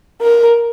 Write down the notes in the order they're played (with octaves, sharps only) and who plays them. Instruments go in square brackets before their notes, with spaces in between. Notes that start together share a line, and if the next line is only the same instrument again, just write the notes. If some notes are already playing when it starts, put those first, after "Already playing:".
[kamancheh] A#4